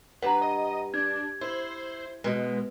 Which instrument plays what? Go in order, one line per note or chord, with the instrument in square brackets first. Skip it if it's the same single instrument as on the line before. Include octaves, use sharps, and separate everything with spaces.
[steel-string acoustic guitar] G2 [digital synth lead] B4 [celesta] F#5 A#5
[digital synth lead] D#5
[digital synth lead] D4 [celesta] G#6
[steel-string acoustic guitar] E4 [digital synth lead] C5
[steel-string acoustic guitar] B2 [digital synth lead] G#3